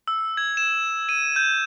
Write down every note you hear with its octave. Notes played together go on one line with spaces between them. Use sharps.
E6
G#6
E7
D#7
G6